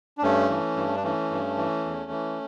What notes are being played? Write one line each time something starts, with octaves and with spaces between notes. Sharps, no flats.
D4
G2 A3 C#4
E3
G2
D4
E3 A3 C#4
G2
E3
E2
E3